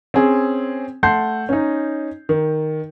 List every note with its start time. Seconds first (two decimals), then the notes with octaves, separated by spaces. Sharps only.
0.14 C4 C#4 G#4
1.03 A3 F#5 A5 C6 G6 C7
1.49 C#4 D#4
2.29 D#3